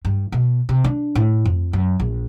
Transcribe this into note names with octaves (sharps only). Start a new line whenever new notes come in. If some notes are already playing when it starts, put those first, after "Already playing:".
G2
B2
C3
D4
A2
F2
F#2
A#1